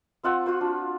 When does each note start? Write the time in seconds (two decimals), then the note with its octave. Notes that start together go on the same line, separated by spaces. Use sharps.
0.23 C4 F4 F#5 E6
0.46 F4 F#4 C5 F#5
0.61 D4